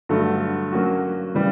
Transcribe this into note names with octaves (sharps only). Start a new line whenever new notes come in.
G2 D3 F#3 A3
F#3 A#3 C#4 F#4
C#3 E3 G3